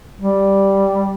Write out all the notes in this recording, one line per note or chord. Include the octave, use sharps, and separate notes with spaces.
G3